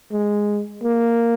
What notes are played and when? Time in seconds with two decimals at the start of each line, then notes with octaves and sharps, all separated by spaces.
0.11 G#3
0.83 A#3